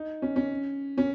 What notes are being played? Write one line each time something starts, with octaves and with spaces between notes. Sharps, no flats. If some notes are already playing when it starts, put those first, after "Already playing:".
Already playing: D#4
C#4
C#4
C#4